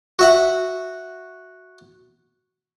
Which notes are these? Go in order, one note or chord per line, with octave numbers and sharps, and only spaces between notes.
F#4 E5 F#5